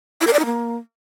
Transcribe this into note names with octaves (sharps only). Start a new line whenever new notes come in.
E4
A#4
D5
D#4
A#3